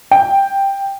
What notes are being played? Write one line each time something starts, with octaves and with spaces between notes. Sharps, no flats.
G5